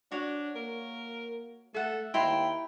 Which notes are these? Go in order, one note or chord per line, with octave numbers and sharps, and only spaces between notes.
D4 F#4 C#5
A#3 A#4
A3 A4 E5 F#5
D#2 E4 G5 A#5 C6